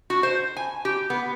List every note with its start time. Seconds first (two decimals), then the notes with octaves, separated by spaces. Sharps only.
0.10 F#4
0.23 C5
0.57 G#5
0.85 G4
1.10 B3